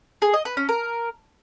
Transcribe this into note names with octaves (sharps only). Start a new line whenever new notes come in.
G#4
D#5
B4
C#4
A#4